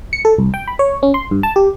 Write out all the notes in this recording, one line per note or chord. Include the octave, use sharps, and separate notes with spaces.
C#7
A4
C2
G5
B5
C#5
C#4
C6
G2
A5
G4